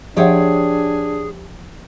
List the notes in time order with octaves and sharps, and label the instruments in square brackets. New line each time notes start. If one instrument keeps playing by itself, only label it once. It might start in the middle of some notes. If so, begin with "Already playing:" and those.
[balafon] F3 E5 F#5 [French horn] D4 [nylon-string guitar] G4 C5 C#5 [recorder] G#4